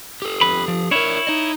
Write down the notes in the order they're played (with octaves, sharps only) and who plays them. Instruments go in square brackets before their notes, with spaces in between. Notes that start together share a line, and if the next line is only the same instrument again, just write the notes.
[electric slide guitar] G4 A4
[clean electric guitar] F2 B4 B5
F3
[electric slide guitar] D4 A#4 [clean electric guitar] E4 C#5
[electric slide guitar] D#4 D#5